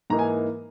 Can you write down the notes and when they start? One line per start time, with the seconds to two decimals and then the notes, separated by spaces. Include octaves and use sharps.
0.10 G#2 E3 A#3 D#4 A#5
0.19 G#5